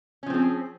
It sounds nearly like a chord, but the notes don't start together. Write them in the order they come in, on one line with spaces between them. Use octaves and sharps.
C#4 F3 C4 G#4